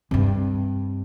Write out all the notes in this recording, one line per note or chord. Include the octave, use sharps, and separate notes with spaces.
G2 C3